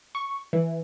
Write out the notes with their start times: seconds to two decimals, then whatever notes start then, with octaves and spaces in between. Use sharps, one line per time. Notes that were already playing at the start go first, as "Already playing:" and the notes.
0.15 C#6
0.53 E3